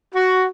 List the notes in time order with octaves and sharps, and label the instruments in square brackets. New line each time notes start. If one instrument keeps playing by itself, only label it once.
[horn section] F#4